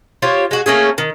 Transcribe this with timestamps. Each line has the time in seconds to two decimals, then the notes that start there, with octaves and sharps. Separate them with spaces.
0.22 F4 G4 C5 C#5
0.51 G#3 F#4
0.66 A3 A#3 C#4 G#4
0.98 D#3